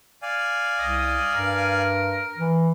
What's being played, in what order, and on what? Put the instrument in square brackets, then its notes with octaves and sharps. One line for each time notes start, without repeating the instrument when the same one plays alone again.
[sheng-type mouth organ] D5 F5 G#5
[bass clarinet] C2 [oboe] D#5
[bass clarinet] G2 [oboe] A#4
[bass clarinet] E3